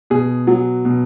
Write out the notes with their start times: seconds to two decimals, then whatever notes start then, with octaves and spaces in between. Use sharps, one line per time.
0.10 B2 G#4
0.47 F#3
0.85 B2